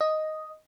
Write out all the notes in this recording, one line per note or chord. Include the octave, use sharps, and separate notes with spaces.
D#5